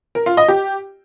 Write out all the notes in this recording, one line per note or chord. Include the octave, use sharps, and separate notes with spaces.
A#4
F4
D#5
G4